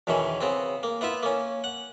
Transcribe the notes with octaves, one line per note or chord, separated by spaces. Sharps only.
E2 B2 D#3 E3 C#4
C#3 B3 C4
A#3
B3 E4 F4 E5
A#3 C#4
F#5